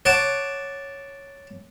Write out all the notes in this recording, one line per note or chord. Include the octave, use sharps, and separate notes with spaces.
C#5 F#5 A5 D6